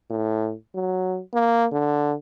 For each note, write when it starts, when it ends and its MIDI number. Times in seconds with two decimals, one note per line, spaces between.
0.11 0.54 45
0.75 1.20 54
1.34 1.65 58
1.72 2.14 50